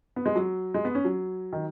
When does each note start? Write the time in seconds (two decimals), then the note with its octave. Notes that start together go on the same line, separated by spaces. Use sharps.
0.16 B3
0.26 G#3
0.35 F#3
0.74 G#3
0.85 B3
0.95 C#4
1.05 F#3
1.53 D#3